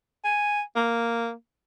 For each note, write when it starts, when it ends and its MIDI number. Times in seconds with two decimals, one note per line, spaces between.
0.24 0.61 80
0.76 1.32 58